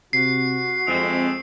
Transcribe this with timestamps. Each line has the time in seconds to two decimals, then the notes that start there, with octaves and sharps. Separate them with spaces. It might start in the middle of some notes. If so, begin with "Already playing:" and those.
0.13 C3 F#4 C7
0.88 F2 G#3 A3 C4